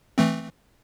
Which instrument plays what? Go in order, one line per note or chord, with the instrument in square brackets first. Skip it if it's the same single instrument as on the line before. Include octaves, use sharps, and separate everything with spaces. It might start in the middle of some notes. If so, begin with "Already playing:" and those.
[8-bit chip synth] E3 A3 C4